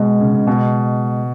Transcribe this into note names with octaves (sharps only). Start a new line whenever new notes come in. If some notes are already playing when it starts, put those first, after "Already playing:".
Already playing: B2 G#3
C#3
C#3
B2